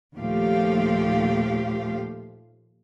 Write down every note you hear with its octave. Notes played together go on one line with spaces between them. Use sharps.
D#2 A#2 F3 A3 G4 F5